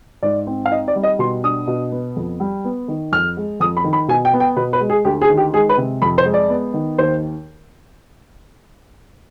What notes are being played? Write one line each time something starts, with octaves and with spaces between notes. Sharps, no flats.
G#2 D5
C4
F5
D#4 D#5
D5
G3
D#5
B2 C6
D4 D#6
B2
B3
F2
G3
B3
D#3
F2 F6
G#3
F2 D#6
B5
D#3
B5
B2 G#5
G5
B3
G5
B2 B4
B4
G#3
G#4
D2 G4
G#4
D#3
G4
G#3 G#4
B4
C3
F2 B5
C5
G#3
D5
B3
D#3
D#2 C5